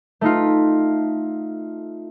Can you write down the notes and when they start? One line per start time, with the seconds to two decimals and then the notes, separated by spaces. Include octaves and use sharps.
0.21 A3 D#4 F4